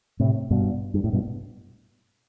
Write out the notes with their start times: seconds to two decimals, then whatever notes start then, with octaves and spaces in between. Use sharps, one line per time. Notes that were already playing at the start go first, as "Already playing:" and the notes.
0.20 A2 C3
0.50 G2 B2
0.94 G2
1.04 A2
1.13 G2 B2